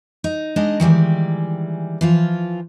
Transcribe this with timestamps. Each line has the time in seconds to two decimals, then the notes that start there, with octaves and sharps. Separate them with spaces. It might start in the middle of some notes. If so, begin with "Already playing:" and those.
0.24 D#4
0.56 G#3 D4 D#4 D#5
0.80 D#3 E3 G3 G#3
2.01 E3 F3 F4